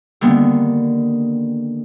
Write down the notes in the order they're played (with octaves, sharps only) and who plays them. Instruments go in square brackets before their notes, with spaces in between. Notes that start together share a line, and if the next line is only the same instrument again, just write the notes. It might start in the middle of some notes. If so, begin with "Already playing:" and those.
[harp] D3 D#3 G3 A#3 B3